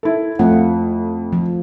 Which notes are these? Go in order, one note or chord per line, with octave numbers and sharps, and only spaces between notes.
E4 A4
F2 A3 F4 F#5
F3